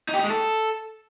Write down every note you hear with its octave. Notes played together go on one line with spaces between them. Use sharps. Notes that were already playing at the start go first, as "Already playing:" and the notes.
D#4
G4
D#4
G#3
A4